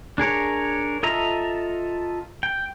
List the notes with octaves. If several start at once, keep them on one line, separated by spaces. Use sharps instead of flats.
D4 G#4 A#4 C#5
F4 A4 D#5 E5 A#5
G5